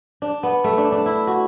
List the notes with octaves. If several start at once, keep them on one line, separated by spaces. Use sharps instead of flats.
D4
B3
A3
D4
D4
E4
F#4